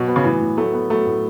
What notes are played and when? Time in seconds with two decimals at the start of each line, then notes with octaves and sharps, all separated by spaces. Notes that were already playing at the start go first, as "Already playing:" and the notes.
Already playing: B2 F#3
0.08 B3
0.16 C#3
0.24 A2 E3
0.40 A2
0.57 F#3 A3
0.73 B3
0.90 F#3 A3
1.06 A2